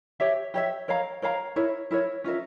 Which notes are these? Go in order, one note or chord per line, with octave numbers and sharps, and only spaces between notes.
G4 C#5 E5
G4 C#5 E5
A#4 C#5 F5 A#5
A#4 C#5 F5 A#5
E4 A#4 C#5
E4 A#4 C#5
C#4 F4 A#4 E5